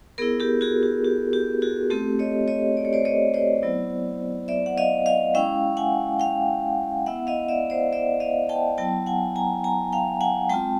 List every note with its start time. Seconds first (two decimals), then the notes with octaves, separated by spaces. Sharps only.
0.18 B3 G#4 A#4
0.22 E4
0.40 G4 A4
0.61 F#4 G#4
0.83 G4
1.04 G4
1.33 G4
1.62 F#4 G#4
1.90 A3 C4 F4 G4 A4
2.19 C#5 D#5
2.48 C#5 D#5
2.77 D5
2.85 C#5
2.93 C5 D5
3.05 C#5 D#5
3.34 C5 D5
3.62 F#3 B3 E4
4.48 D5 E5
4.66 F#5
4.78 D#5 F5
5.06 D#5 F5
5.34 G#3 C#4 E4 F5 G5
5.77 F#5 G#5
6.20 F5 G5
7.06 B3 E4 E5 F#5
7.27 D#5 F5
7.48 D5 E5
7.70 C5 D5
7.93 D5 E5
8.20 D#5 F5
8.49 G5 A5
8.78 F#3 B3 E4 G5 A5
9.06 F#5 G#5
9.36 G#5 A#5
9.64 G#5 A#5
9.93 F5 G5
10.21 F#5 G#5
10.49 G#3 C4 F4 G5 A5